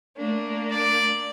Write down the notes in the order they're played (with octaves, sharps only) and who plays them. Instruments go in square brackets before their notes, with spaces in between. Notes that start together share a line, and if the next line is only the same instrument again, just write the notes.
[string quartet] A3 A#3 D4
[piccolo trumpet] D5